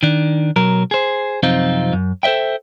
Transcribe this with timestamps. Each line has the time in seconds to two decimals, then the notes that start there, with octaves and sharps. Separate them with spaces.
0.03 D#3 D4
0.56 B1 F#3 A#4
0.91 G#4 C5
1.43 F#2 C3 F3 C4 D#4 F4
1.93 F#2
2.23 A4 C5 D#5 E5 G5